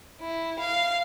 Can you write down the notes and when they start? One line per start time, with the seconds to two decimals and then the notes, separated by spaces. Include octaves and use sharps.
0.21 E4
0.59 F5